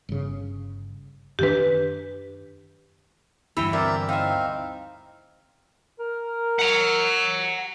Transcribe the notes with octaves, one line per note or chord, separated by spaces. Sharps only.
G1 C#3
F#2 D#3 D4 G4 B4
D2 G2 E3 E4 C#5 G5
C4 A#4 D5 E5
C4 D#4 E5 F5
A#4
F#5 A#5